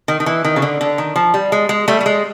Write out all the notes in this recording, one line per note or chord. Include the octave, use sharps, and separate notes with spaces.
D#3
D#3
E3
D#3
C#3
D3
D3
D#3
F3
G3
G#3
G#3
G3 A3
A3
G#3